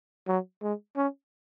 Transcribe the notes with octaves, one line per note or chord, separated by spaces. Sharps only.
F#3
G#3
C#4